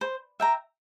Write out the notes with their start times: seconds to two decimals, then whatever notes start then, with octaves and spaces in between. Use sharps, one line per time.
0.01 C5
0.40 E5 G5 A#5